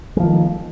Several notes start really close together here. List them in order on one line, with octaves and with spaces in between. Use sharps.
G#3 F3 D#3